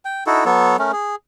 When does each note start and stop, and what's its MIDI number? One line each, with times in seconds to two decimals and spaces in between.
0.05 0.24 79
0.27 0.45 63
0.27 0.45 64
0.27 0.45 66
0.27 0.45 69
0.45 0.77 54
0.45 0.77 59
0.45 0.77 69
0.45 0.77 73
0.79 0.92 57
0.79 0.92 61
0.79 0.92 70
0.92 1.15 68